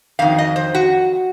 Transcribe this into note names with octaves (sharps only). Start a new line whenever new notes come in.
F2 D#3 F#3 F5
D#5
C5
F#4